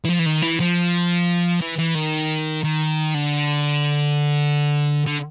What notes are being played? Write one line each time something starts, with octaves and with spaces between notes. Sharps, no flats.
E3
F3
E3
D#3
E3
F3
E3
E3
D#3
D#3
D3
D3